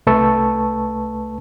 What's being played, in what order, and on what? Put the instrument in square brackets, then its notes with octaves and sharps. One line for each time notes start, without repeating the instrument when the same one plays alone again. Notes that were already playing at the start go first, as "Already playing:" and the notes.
[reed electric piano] C2 A3 B4 A5 C#6 E6